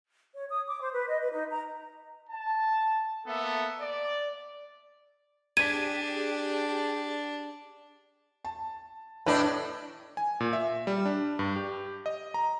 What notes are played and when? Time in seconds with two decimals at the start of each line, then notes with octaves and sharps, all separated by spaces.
0.34 C#5
0.50 D#6
0.68 D6
0.81 C5
0.93 B4
1.08 D#5
1.20 B4
1.32 D#4
1.50 A#5
2.30 A5
3.27 A#3 B3 A4 E5
3.80 D5
5.57 D4 G4 G#4 G5 G#6 B6 D#7
8.45 A5
9.26 A2 D4 B4 D5 D#5
10.17 G#5
10.40 A#2
10.53 E5
10.87 G3
11.06 D4
11.39 G2
11.56 G4
12.06 D#5
12.34 A#5